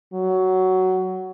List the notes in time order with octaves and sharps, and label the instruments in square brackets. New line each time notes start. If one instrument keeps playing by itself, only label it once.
[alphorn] F#3